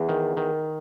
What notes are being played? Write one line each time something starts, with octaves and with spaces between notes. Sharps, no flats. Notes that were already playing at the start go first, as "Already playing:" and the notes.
Already playing: E2
D#3
D#3